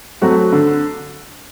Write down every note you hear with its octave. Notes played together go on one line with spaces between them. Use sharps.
F#3 A3 C4 F#4
D3